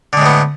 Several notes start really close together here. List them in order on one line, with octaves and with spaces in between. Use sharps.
D3 G#3 A2 B3